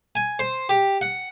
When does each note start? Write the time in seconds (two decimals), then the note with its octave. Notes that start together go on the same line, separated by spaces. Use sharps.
0.15 G#5
0.39 C5
0.69 G4
1.01 F#5